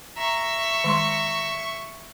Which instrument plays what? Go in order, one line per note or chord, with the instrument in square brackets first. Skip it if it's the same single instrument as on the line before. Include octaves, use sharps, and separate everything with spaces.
[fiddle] E5 C#6 [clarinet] A#5
[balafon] D#3 G#3 C6